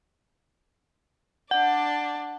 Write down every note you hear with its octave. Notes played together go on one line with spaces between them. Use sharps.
D4 D5 F#5